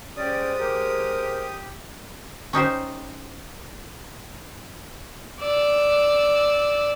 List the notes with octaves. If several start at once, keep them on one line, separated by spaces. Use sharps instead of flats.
G#3 C#4 G4 C5 D5 D#6
G4 A#4
C#4 D#4 G4 C5
D5 E6